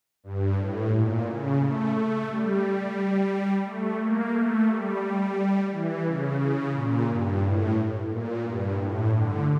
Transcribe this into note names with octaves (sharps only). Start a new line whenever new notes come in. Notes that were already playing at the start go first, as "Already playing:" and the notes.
G2
A2
A#2
C#3
A3
A3
G3
A3
A#3
A3
G3
E3
C#3
C#3
A#2
G2
A2
A#2
G2
A2
D3